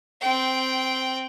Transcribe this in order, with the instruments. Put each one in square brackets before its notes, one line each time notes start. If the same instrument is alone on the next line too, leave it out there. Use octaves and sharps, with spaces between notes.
[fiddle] C4 G5